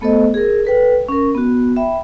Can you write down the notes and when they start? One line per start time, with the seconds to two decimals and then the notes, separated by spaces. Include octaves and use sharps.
0.01 A3 B3 A4 C5 D#5
0.34 G#4 A#4
0.65 A4 B4 G5
1.09 C#4 A#4
1.35 B3 F#4
1.76 E5 G5 B5